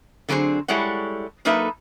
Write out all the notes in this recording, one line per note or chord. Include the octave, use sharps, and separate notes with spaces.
D3 F#3 C4 G#4 C5
G3 G#3 E4 A4 C#5 F#5
F#3 A#3 D#4 A4 B4 E5